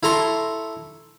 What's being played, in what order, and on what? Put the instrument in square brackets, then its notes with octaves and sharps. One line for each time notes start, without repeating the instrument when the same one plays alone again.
[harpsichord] E4 A4 A#5 C6 C#6